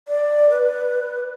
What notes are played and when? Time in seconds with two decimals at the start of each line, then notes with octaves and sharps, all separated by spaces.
0.08 D5
0.50 B4